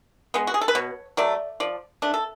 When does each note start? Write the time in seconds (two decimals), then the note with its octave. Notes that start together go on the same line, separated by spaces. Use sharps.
0.34 G#3 B3
0.47 F#4
0.54 G#4
0.61 A4
0.68 B4
0.75 B2 C#5
1.17 F#3 A3 D5
1.60 F3 D5
2.02 A3 D4
2.14 A4